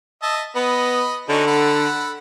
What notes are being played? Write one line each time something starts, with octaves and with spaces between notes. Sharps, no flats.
D#5 E5 A5
B3 D#5 B5
D3 C#4 D#4 F#4
A4 F#5 B5